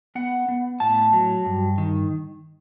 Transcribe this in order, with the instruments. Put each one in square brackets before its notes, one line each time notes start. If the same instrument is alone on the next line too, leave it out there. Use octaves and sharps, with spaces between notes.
[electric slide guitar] B3 F#5
B3
A2 A5
F#3
G2
D#3